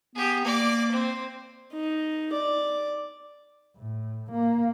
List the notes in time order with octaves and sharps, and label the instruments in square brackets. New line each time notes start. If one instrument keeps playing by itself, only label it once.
[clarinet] B3 [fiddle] G4 G#4
[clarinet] A#3 [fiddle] D5 D6
[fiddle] C4
[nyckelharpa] D#4
D5
[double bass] A2
A#3